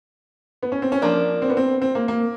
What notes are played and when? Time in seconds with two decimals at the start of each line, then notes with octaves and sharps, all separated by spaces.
0.63 B3
0.72 C#4
0.82 C4
0.92 C#4
1.02 F3 A#3 D4
1.42 C4
1.49 B3
1.57 C4
1.82 C4
1.95 A#3
2.08 A#3